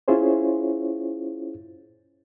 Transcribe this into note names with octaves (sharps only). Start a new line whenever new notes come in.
C#4 E4 F4 G#4 C5 C#5